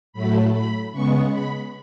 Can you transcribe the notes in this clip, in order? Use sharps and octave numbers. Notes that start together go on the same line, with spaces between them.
A2 F#3 A3 B5
B5
C#3 G#3 B3 C#6
B5